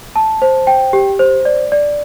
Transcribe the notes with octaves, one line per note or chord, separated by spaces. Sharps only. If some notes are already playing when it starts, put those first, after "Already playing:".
A5
C5
G5
G4
C5
D5
D5